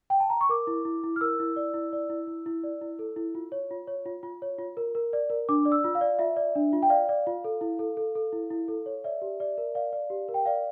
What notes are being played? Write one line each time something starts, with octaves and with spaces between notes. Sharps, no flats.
G5
A5
A#5
C#6
A#4 D6
E4
E4
E4
F6
A#4 E6
E4
D5
E4
D5
E4
E4
E4
D5
E4
A4
E4
F4
C#5
F4
C#5
F4
F4
C#5
F4
A#4
A#4
D5
A#4
D4 D6
D5
E6
F4
F5
D5
F4 E5
D5
D4
F4
G5
D5 F5
D5
F4
A4
E4
A4
A4
A4
E4
E4
A4
C#5
D5 E5
G4
D5
A#4
D5 F5
D5
G4
A#4
G5
D5 F5